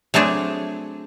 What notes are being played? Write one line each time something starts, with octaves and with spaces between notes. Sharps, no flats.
F#3 A3 C4 D4 G#4